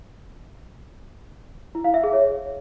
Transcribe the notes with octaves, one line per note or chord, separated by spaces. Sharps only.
E4
F5
E5
G#4
C#5